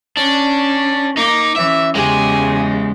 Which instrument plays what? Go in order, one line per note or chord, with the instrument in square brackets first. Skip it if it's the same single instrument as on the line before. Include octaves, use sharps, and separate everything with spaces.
[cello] C#4 [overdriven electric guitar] D4
[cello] A#3 [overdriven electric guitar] D#4 [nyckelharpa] D6
[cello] E3 C#4 [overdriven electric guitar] E5
[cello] E2 C#3 [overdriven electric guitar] G#3 [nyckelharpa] G4 G#5